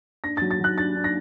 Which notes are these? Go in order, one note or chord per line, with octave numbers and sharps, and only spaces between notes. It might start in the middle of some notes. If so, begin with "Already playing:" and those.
D4 A#6
F#3 A6
A6
F#3 F#6
D4 A6
D4
A#6